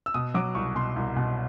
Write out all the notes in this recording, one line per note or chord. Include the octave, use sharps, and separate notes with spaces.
E6
B2 D#6
F#3 D6
C2 C#6
B2 C6
C2
B2